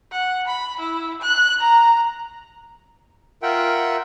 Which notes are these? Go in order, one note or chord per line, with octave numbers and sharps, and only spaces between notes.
F#5
B5
E4
F#6
A#5
F4 A#4 E5 F#5 G5